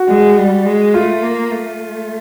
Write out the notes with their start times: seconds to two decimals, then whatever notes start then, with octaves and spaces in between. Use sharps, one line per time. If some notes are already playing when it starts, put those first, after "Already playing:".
Already playing: F#4
0.08 G#3
0.37 G3
0.65 G#3
0.94 A3 F4
1.23 A#3
1.51 A3